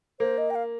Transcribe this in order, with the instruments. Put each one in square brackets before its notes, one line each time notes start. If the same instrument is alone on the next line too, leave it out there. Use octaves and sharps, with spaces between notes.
[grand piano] A#3 [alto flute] C5
[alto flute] D#5
G5
F5